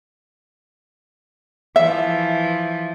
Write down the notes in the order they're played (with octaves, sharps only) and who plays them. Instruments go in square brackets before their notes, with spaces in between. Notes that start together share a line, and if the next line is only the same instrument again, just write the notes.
[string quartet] E3 F3 [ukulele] E5